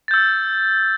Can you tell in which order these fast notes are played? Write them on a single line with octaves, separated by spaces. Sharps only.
A6 G6 E6